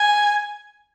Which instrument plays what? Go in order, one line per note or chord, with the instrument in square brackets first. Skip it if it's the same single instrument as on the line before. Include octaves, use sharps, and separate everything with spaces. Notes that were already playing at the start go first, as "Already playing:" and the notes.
Already playing: [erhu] G#5